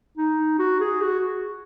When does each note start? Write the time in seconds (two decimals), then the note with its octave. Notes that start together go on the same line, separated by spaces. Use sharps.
0.17 D#4
0.59 F#4
0.81 G#4
1.02 F#4